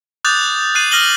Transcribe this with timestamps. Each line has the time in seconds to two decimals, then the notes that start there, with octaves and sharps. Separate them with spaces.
0.25 D6 D#6 F#6 G6 A6 F7
0.75 F#6 C7 D#7 F#7
0.91 D#6 F6 A#6 D#7 F#7 G7